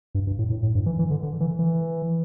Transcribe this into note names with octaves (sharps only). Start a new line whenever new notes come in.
G2
G2
A2
A2
A2
G2
E3
E3
D3
D3
E3
E3